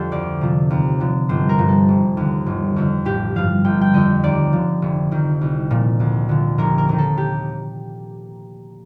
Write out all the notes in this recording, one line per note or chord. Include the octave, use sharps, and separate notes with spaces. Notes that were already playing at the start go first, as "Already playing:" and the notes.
Already playing: F2 D3 F3 G4 A4 C5
D2 D5
C3 F3
D#2
D3 F3
G1 C5
A#4
G2 F3
A4
F1
D#2 D3
G1
F2 D3
A1 G4
G2 F3 F5
G1 G5
G5
F2 D3 D#5
D#2 D5
D3 F3
F1
F2 D#3
C2
A#2 F3
D2
D3 F3
F1 A#4
A#4
D#2 D#3 A#4
A4
G4